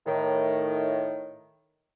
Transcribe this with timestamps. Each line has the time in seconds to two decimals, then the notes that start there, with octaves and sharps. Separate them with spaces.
0.07 A2 D#3